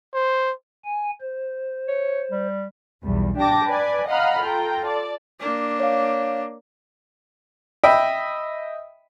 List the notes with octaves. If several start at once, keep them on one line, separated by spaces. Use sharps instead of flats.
C5
G#5
C5
C#5
G3
B1 E2 G3
D4 G4 G5 A5 D6 A#6
B4 D5 G#5
D#5 F5 F#5 A#5 B5 F6
F4 A4 G5 A#5
D5 A5
A#3 D4
C#5 F5
D#5 E5 G5 B5